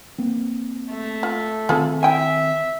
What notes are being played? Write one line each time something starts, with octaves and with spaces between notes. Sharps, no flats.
A#3 C4
A3
F4
D#3 C4 F4 G#4 A4
E4 E5 G5 G#5